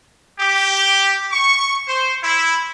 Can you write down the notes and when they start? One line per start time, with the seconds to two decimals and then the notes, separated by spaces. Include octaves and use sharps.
0.40 G4
1.31 C#6
1.87 C5
2.23 E4